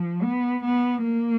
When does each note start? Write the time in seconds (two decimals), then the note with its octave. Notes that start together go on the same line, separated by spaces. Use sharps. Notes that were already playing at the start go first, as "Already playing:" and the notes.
Already playing: F3
0.23 B3
0.64 B3
1.04 A#3